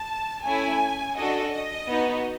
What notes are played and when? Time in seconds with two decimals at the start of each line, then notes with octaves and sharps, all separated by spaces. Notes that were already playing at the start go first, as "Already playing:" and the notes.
Already playing: A5
0.43 A3 C#4 E4 G#5
1.16 D4 F#4 A4 D#5
1.52 D#5
1.88 B3 D#4 F#4